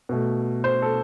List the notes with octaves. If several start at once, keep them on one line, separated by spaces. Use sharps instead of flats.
B2 A3
C5
A4